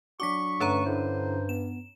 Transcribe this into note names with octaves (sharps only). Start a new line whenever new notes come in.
F#3 D4 F#4 C#6 D6 B6
G2 D3 A3 C#4 B4 C#5 A#5
D3 E4 C5
B3 E7